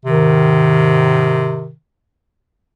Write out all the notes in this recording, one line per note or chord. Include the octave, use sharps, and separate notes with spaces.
G#2 C3 D#3